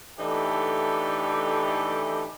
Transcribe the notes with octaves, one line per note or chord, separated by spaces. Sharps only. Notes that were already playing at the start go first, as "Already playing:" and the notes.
E3 A3 D4 D#4 G4 A4